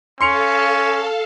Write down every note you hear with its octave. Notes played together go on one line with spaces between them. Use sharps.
C#4 A4 F5 A5 C6 C#7 F7